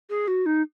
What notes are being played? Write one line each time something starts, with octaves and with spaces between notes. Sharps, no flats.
G#4
F#4
D#4